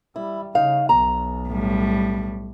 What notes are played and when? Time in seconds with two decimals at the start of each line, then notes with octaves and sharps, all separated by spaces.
0.16 G3 E4
0.55 C#3 D#4 F5
0.89 B1 A#5
1.49 A2 G3